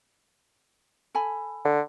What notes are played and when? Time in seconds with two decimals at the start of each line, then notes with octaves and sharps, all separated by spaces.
1.15 A4 G#5 B5
1.65 D3